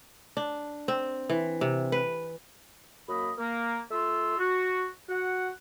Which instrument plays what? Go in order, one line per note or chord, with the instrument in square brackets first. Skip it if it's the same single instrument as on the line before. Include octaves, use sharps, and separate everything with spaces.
[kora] D4
C4
E3
C3
B4
[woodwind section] F#2 A#3 D#5 B5
A#3
A3 F4 C6 E6
F#4
F#4 F#5